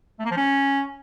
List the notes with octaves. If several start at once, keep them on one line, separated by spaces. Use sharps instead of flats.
A3
A#3
F3
C#4